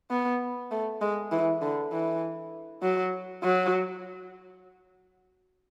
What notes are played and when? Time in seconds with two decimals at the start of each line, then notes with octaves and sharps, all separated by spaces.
0.11 B3
0.71 A3
1.01 G#3
1.32 E3
1.62 D3
1.92 E3
2.83 F#3
3.43 F#3